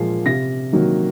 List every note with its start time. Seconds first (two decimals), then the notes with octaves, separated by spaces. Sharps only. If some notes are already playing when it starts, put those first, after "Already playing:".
Already playing: A#2 F3 G#3 C7
0.26 C3 A#6
0.72 D#3 F#3 A#3